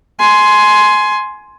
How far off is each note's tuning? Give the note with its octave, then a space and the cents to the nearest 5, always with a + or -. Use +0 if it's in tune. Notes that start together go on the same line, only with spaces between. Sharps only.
G#5 +20 C6 +0